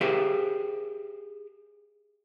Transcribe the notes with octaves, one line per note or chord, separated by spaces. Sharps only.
G4 G#4 A#4 C5 E5 F5